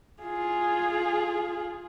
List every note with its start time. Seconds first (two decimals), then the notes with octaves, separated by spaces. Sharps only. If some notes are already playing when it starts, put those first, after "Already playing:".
0.22 F4 G#4